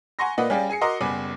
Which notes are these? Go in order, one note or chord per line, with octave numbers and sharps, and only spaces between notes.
F#5 G#5 A#5 C6 C#6 A#6
A#2 A#3 B4 D5 D#5 F#5
G3 C#4 G#4 D5 F5 G5
G#4 G#5 C7 C#7
F#4 A#4 D#5 A#5 C6 D6
F#1 G3 B3 B4 G#5 D6